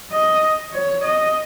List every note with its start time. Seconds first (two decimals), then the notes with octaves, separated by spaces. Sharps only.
0.12 D#5
0.73 C#5
1.04 D#5